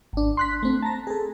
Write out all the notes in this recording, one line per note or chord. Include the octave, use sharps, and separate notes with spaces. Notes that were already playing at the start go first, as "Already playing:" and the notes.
G#1 D4
C6 F#6 B6
A3 C4
A5 A#5 A#6
G#4 A4